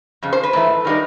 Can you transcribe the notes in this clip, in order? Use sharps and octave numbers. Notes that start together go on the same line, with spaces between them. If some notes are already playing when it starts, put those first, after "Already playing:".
F2 C#3
C5
B4
G#2 E3 A3
D#3 G3 A#3 D#4